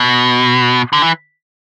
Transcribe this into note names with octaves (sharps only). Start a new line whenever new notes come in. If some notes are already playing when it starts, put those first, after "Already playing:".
Already playing: B2
D3
E3